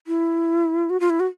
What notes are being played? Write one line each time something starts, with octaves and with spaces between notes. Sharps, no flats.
E4
F#4
F4
E4
F#4